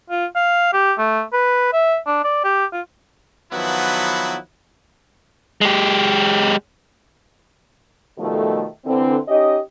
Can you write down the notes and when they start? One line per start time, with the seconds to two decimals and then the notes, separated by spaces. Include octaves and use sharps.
0.10 F4
0.36 F5
0.73 G4
0.99 A3
1.33 B4
1.73 E5
2.07 D4
2.24 D5
2.44 G4
2.73 F4
3.53 D#3 F3 F#3 B3 E4 B4
5.61 G#3 G4
8.18 B2 D#3 F3 G3 A3
8.86 D3 E3 C4
9.28 C#4 D#4 G4 D#5